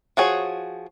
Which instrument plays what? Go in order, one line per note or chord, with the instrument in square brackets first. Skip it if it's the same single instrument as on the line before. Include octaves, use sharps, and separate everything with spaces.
[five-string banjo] F3 F#4 G#4 C#5